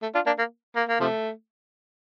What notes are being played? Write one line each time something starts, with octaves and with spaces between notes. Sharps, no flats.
A3
D4 F4
A#3 D4
A#3
A#3
A#3
C3 F3 A3